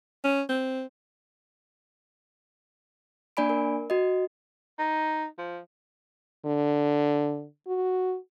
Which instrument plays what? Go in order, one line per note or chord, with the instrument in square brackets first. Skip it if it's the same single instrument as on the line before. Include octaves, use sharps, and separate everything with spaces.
[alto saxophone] C#4
C4
[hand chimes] A#3 D4 D5 G#5 B5 D7
A#4
F#4 D#5
[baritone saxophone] D#4
F3
[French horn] D3
F#4